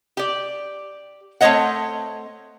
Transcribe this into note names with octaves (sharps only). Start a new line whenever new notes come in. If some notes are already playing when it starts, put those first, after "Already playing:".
G4 D5
A3 C4 D#4 C#5 D#5 F#5